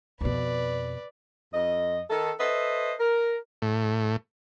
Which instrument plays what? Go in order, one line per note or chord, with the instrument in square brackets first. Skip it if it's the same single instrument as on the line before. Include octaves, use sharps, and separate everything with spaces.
[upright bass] F2 B2 [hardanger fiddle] B4 D5
[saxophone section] F2 D#5
D#3 A4
A4 B4 C5 D#5 E5
A#4
[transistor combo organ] A2